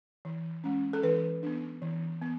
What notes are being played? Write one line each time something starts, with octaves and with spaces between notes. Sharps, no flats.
E3
G#3 C#4
A4
E3 B4
B3 D4
E3
B3